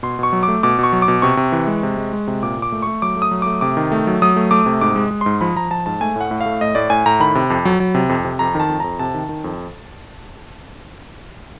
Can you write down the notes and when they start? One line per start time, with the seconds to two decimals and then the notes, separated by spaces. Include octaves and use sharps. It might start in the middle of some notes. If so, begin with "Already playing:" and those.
0.03 B2 C6
0.19 B2 C#6
0.33 F#3
0.43 D6
0.48 A3
0.63 B2 D6
0.79 B2 C#6
0.93 F#3
1.02 D6
1.08 B2
1.22 C3 C#6
1.37 C3
1.52 E3
1.67 G#3
1.83 C3
1.97 G#3
2.13 G#3
2.27 C3
2.43 A#2 D6
2.57 A#2
2.62 D6
2.72 A3
2.82 A3 C#6
3.02 F#3 D6
3.16 A3
3.22 D#6
3.31 F#3
3.42 A3 D6
3.61 C3 D6
3.77 D#3
3.92 A3
4.07 F#3
4.22 F#3 D#6
4.36 A3
4.51 A3 D6
4.66 C3
4.81 G#2 D6
4.96 G#3
5.11 G#3
5.21 G#2 C6
5.41 F3 B5
5.56 F3 A#5
5.71 F3 A5
5.86 G#2 A5
6.01 A3 G#5
6.16 A2 F#5
6.31 A2
6.41 F5
6.46 A3
6.61 A2 D#5
6.75 A2 D5
6.90 A2 G#5
7.06 A2 A#5
7.20 D#3 B5
7.35 C3
7.50 F2
7.65 F#3
7.80 F#3
7.95 C3
8.09 F2
8.25 C3
8.39 F2 A#5
8.55 D#3 A5
8.69 F2
8.80 F2 A#5
8.99 C3 A5
9.14 D#3
9.29 D#3
9.44 F2